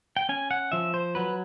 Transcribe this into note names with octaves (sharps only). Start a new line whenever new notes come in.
G5
C#4 G#5
F#5
F3 E5
C5
F#3 B4